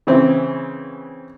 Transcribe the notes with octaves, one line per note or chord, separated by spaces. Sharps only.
C#3 E3 C4